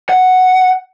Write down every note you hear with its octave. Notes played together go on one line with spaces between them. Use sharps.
F#5